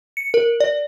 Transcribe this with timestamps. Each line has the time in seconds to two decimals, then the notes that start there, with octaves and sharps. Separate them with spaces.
0.17 C#7
0.34 A#4
0.60 D5